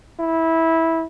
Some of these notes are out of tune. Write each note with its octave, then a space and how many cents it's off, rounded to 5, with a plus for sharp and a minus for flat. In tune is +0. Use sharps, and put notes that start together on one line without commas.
E4 -15